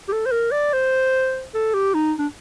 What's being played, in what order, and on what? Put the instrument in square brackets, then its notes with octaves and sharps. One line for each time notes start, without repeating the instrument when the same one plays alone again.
[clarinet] G4
A4
C5
A#4
D5
C5
A4
G4
D#4
D4